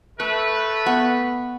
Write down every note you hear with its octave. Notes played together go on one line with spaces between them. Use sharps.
A3 B4 C#6
B3 C#6